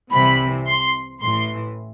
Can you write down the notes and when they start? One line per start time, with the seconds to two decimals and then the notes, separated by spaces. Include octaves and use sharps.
0.11 C2 C3 E3 B5
0.66 C6
1.20 A1 A2 E3 C6